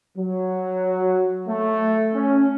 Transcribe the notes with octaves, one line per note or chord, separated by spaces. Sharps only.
F#3
A3
C#4